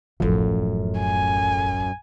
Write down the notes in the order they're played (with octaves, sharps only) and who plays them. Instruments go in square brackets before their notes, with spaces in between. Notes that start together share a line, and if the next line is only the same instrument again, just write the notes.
[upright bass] E1 A1 [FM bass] F#2 [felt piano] F3 A3
[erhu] G#5